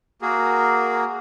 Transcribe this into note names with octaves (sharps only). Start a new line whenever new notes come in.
A#3 F#4 G#4 A#4